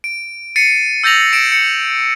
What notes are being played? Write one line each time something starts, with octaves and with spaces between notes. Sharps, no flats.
D7
A6 C7 C#7 D#7
E6 G6 A6 A#6 F7 F#7
C#7 D7 E7
C#7